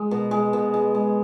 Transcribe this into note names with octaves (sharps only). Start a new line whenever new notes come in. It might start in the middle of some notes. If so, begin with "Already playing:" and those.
Already playing: G#3
B2
G#3
B2
G#3
G#3